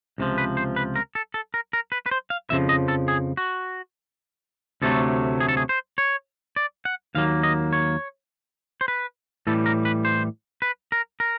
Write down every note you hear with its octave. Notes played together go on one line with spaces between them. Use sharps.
C#2 C3 F3
B4
C5
B4
A#4
A4
A4
A#4
A#4
B4
B4
C5
F5
F2 C#3 F3 E5
D#5
A4
G#4
F#4
D2 C3 D#3 F#3 A3 A4
G#4
A4
G#4
C5
C#5
D5
F#5
D#2 D#3 F#3 A#3 F5
D#5
C#5
C5
B4
A2 E3 G3 A4
A#4
B4
C5
B4
A#4
A#4